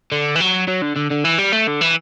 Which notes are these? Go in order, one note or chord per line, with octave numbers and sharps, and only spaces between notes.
D3
E3
F#3
F#3
D3
D3
D3
E3
G3
A3
D3
E3